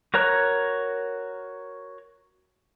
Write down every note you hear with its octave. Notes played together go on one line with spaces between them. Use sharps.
F#4 A#4 C#5 A#5 F#6